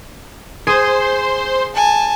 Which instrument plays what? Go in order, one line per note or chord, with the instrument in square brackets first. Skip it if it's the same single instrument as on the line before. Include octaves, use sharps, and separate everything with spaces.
[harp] G#4 D#7 [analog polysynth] C5 C6
[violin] G#5 A5